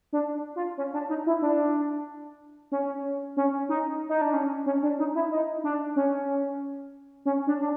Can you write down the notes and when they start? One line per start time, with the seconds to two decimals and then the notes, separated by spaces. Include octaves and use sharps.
0.13 D4
0.56 F4
0.78 C#4
0.94 D4
1.09 D#4
1.27 E4
1.42 D4
2.72 C#4
3.37 C#4
3.69 D#4
4.09 D#4
4.21 D4
4.34 C#4
4.66 C#4
4.83 D4
4.99 D#4
5.15 E4
5.31 D#4
5.64 D4
5.96 C#4
7.26 C#4
7.47 D4
7.61 D4